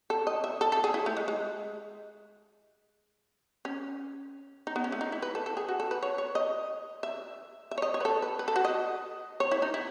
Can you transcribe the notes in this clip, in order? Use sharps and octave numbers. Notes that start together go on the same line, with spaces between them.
A4
D#5
E5
A4
A4
G#4
E4
A3
G#3
G#3
C#4
D#4
B3
C#4
A3
D#4
E4
B4
A4
A4
G#4
F#4
A4
B4
C#5
C#5
D#5
E5
E5
C#5
D#5
C#5
B4
A4
B4
B4
A4
F#4
D#5
C#5
E4
D#4
E4